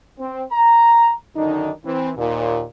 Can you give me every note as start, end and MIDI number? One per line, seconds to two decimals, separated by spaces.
0.19 0.44 60
0.52 1.12 82
1.36 1.71 42
1.36 1.71 50
1.36 1.71 51
1.36 1.71 62
1.36 1.71 63
1.85 2.11 52
1.85 2.11 60
2.17 2.63 39
2.17 2.63 46